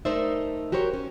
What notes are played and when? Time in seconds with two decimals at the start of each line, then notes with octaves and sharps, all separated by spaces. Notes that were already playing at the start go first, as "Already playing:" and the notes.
0.05 A3 D#4 A#4 C5 D5 E5
0.72 F#4 G4 A#4 C5 C#5
0.93 C#4